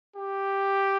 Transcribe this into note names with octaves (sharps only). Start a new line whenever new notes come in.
G4